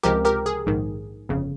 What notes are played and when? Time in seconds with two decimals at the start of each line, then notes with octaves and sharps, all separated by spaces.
0.03 C#2 C3 F3 G#3 G4 A#4
0.25 G4 A#4
0.46 G#4
0.66 A#1 G#2 D#3
1.29 G1 F2 C#3